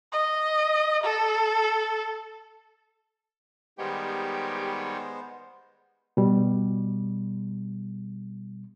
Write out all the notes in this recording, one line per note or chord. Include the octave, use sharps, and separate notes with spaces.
D#5
A4
D#3 G3 G#3 B3 G4 C5 C#5
B2 G3